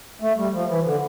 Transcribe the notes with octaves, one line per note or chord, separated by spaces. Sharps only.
A3
G3
F3
E3
D3